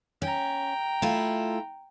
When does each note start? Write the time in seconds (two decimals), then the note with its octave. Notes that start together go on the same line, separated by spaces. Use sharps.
0.22 C#4 G5 A#5
1.02 A3 E4 F4